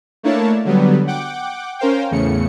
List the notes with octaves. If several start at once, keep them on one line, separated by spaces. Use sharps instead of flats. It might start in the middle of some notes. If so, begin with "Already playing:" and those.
A3 A#3 D4 E4 C#5 A5
D3 F#3 G3 B3
F#5 G5 D6
C#4 A#4 C5 F5 G5
E2 A2 C#3 C#7